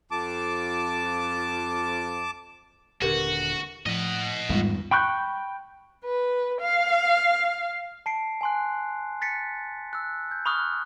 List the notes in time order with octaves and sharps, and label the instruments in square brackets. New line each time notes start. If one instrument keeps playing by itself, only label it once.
[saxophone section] F2 [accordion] A5 D6
[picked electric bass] D#1 D3 [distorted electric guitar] F#4 [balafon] G4 A#4 B4
[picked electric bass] A2 [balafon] F3 [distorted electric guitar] D#5 F#5
[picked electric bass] E2 D#3 B3 [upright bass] G#2 [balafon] G3 F4
[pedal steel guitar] G5 B5 C#6 F#6 G6
[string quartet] B4
F5
[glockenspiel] A5 C7 D7
G#5 C6 F#6
F#6 A6 B6 C#7
E6 F#6
G6
B5 C#6 D#6 F6 F#6